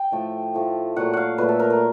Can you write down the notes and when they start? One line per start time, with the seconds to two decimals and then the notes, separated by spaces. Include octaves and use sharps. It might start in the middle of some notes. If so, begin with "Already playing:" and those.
Already playing: G5
0.12 A2 F3 A3
0.54 A2 F3 A3
0.96 A#2 F#3 A3 F#5
1.13 F5 F#5
1.38 A#2 F#3 A3 B4
1.49 A4
1.59 A#4
1.70 A#4